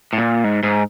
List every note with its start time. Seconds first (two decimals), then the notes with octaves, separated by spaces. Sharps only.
0.13 A2
0.18 A#2
0.44 G#2
0.63 G#2